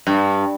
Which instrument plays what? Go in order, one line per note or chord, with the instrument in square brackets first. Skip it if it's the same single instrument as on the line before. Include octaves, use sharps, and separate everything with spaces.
[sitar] G2